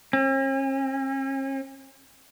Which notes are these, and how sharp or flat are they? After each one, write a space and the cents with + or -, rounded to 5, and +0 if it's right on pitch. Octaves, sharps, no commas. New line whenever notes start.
C#4 -45